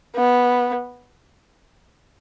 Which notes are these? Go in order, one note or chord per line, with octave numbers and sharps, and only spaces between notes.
B3